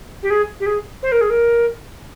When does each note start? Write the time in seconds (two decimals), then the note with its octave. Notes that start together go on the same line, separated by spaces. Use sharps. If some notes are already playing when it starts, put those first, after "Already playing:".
0.22 G4
0.30 G#4
0.59 G4
0.66 G#4
1.02 C5
1.11 A#4
1.21 G#4
1.29 A#4